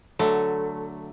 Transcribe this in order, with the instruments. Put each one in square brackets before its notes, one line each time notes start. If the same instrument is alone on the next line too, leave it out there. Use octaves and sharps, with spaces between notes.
[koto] D3 F#3 A3